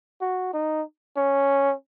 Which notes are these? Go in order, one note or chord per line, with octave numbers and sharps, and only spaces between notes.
F#4
D#4
C#4